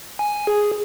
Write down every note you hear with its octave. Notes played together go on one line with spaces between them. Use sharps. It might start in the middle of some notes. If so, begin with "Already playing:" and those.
G#5
G#4